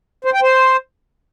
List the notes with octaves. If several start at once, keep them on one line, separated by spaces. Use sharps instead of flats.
C5
G5
C5